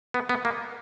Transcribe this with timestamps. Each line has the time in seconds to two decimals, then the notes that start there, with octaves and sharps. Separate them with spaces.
0.14 B3
0.29 B3
0.45 A#3